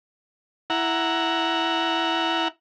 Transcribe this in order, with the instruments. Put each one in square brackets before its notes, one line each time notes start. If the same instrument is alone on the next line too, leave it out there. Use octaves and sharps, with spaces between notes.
[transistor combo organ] E4 F#5 A#5